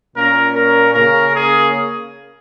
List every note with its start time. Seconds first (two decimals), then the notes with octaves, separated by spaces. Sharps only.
0.14 A#2 A#3 C#4 A#4
0.55 A#4
0.94 C#3 A#3 C#4 A#4
1.34 G#4